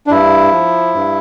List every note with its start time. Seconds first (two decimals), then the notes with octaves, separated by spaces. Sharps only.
0.07 D4
0.10 G2 E4
0.53 F3
0.94 G2